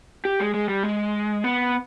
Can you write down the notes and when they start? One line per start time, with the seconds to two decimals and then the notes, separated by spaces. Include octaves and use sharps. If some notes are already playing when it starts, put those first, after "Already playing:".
0.25 G4
0.40 G#3
0.54 G#3
0.69 G3
0.83 G#3
1.44 B3